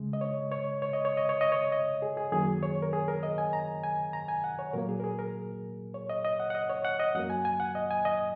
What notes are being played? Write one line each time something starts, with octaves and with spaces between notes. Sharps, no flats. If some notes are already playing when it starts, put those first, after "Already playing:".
Already playing: C#3 G#3
D#5
C#5
C#5
C#5
D#5
C#5
D#5
C#5
D#5
C#5
D#5
G#4
G#4
F#2 D#3 F#3 A#3 G#4
C#5
A#4
G#4
A#4
D#5
G#5
A#5
G#5
A#5
G#5
F#5
C#5
A#2 F#3 A#3 A#4
G#4
A#4
G#4
A#4
C#5
D#5
D#5
F#5
F#5
D#5
C#5
F#5
D#5
F#2 F#3 A#3 F#5
G#5
G#5
F#5
D#5
G#5
D#5